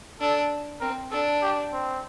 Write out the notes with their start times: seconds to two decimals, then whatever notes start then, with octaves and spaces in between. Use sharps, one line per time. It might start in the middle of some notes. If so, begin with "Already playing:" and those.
0.20 D4 A4
0.81 C4 A#4
1.11 D4 A4
1.42 G4
1.73 C4